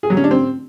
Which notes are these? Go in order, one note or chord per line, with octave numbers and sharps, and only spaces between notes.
G#4
F#3
C#4
D4
C4